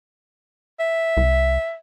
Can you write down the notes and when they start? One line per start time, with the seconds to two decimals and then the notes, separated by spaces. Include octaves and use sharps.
0.80 E5
1.17 C2